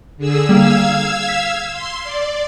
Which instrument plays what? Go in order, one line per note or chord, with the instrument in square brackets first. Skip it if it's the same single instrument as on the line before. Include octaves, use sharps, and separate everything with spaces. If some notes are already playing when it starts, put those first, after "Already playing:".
[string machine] D3 G#4 E6
[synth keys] G3 A#3 [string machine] F5 E6 G#6
[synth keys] B6
[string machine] C6
D5